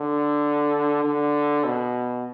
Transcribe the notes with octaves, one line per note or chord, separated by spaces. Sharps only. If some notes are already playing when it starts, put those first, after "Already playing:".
Already playing: D3
D3
B2